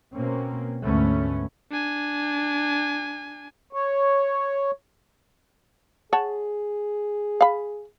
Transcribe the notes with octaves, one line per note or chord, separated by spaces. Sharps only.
B2 A#3 C4 C#4
D2 G#2 A3 B3 C#4
D4 G#5
C#5
G#4 C#5 F#5 A5
F5 B5